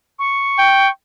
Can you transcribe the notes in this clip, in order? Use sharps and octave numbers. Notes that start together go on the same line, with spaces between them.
C#6
G5